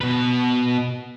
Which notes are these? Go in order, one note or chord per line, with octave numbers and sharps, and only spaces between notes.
B2 B4